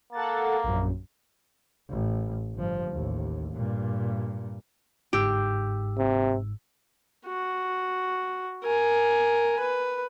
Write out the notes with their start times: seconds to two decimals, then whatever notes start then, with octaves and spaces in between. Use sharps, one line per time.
0.13 A#3 A4 F#5 A6
0.64 A#1 F#2
1.90 A1
2.55 G1 F3
2.90 A1 D#2
3.53 G2 A#2
5.13 G1 G#2 G4 E6
5.97 C3
7.26 F#4
8.64 A#4 G#5
9.59 B4